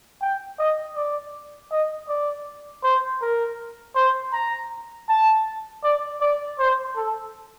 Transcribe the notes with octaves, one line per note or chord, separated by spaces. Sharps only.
G5
D#5
D5
D#5
D5
C5
A#4
C5
A#5
A5
D5
D5
C5
A4